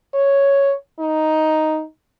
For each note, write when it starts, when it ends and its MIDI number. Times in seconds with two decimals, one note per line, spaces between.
0.14 0.74 73
1.00 1.83 63